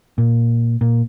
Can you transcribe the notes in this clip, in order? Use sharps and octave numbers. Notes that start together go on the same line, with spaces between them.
A#2
A#2